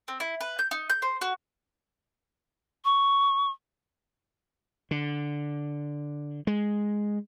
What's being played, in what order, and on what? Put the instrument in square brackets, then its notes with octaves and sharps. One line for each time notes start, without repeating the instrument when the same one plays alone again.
[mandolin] C4
E4
B4
G6
D#4
G6
C5
F#4
[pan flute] C#6
[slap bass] D3
G#3